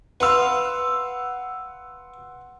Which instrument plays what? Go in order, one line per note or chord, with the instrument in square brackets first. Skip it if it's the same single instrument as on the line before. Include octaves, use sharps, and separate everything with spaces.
[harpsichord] B4 F5 [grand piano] F#5 C6 E6